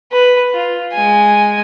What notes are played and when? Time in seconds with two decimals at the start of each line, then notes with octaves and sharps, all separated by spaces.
0.12 B4
0.54 F4
0.93 G#3 G#5